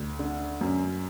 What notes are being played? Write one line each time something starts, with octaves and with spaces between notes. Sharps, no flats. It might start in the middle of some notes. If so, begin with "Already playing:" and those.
Already playing: D2
D3
F#2